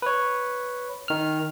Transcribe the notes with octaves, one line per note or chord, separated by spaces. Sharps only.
B4 C#5
D#3 F6